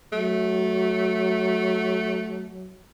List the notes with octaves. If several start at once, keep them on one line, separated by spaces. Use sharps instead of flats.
F#3 A3